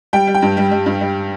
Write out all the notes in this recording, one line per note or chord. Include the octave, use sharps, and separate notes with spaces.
G3 G5
G3
G5
G2
G3
G3
G2
G3